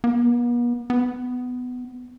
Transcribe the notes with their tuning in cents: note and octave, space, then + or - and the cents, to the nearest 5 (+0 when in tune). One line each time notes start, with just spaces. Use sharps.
B3 -45
B3 +15